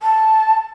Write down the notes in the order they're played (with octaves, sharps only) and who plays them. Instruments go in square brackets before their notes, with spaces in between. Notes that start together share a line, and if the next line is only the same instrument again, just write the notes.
[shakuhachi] A5